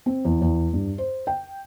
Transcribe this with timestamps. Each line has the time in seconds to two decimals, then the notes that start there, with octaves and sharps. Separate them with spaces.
0.06 C4
0.25 E2
0.42 E2
0.73 G2
0.98 C5
1.27 G5